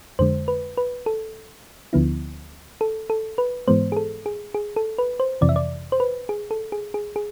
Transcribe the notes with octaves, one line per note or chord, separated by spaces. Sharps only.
F2 D3 G#3 C5
B4
B4
A4
D2 D3 F3 B3 E4
A4
A4
B4
G#2 E3 G#3 B3 C5
G#4
A4
G#4
G#4
A4
B4
C5
F2 C3 E3 D5
E5
D5
C5
B4
G#4
A4
G#4
G#4
G#4